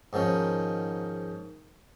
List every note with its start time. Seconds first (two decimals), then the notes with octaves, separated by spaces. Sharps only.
0.13 G#2 D#3 F3 C#4